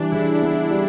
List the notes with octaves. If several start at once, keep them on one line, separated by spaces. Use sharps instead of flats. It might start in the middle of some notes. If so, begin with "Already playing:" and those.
Already playing: E3 G3 D4
C#3 E4
B3
G3